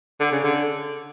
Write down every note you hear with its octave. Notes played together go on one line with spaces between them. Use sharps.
D3
C#3
D3